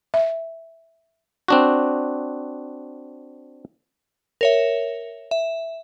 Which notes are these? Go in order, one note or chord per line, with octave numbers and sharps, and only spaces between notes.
E5
C4 D4 F#4
A#4 C#5 E5
E5